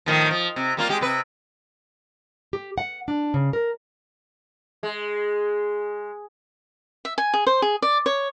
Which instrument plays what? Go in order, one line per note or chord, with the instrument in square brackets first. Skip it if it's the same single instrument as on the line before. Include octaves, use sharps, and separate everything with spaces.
[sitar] A2 D#3 F3
F3
C3
G3 A#3 F4
G#3 G4
C3 B4
[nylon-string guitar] G4
F#5
D4
C#3
A#4
[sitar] G#3
[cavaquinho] E5
G#5
G#4
C5
G#4
D5
C#5